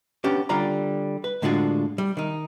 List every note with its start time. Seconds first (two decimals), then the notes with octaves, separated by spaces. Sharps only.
0.24 B3 C#4 D4 G4
0.49 D3 G3 F4 D5 A#5 B5
1.24 B4
1.42 A2 D3 G#3 D4 F4 F#4
1.98 G3
2.17 D#3 D#4